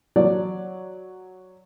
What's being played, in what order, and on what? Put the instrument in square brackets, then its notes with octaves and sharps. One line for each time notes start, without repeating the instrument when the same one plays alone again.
[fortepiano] F#3 D5